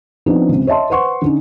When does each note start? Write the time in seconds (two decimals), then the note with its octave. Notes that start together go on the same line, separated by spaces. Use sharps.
0.26 F3 B3 C4 D4 D#4
0.49 C#2 C3
0.67 C#5 D#5 E5 A5 C6
0.90 B4 C5 F#5 C6 C#6
1.22 D3 C#4 D#4